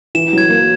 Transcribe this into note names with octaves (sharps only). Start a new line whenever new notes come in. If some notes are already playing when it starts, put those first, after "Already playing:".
E3 E7
F#3 G#6
A#3